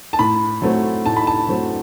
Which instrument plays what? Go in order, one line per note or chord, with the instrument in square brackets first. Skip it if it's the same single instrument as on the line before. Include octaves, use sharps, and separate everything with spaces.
[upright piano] A5
A2 B5
F#3 A3 C4
A2 A5
B5
A5
F#3 A3 C4